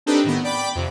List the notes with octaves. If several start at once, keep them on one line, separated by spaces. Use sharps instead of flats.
C4 D4 D#4 G4 A4 B4
A2 D#3 B3
D5 G5 B5 D6
F2 C3